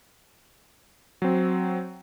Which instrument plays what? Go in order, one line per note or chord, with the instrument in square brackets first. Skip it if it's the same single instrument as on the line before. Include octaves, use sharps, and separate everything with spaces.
[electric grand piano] F#3 C4